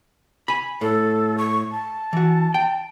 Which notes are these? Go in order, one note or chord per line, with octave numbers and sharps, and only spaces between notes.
G#5 B5
A2 A4
C#6
A5
E3 F#4
G5